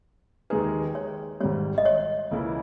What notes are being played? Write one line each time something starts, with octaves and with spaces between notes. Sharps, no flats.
D#2 D#3 G#3 D#4 G#4 B4
C#5
G#1 G#2 G3 C#5
D#5
C#5
C#2 C#3 E3 A#3 E4